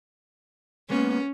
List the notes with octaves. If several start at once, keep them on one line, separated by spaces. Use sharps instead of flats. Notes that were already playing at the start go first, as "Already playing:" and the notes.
G#3 A#3 B3 C#4